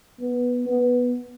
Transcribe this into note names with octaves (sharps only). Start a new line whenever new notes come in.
B3
B3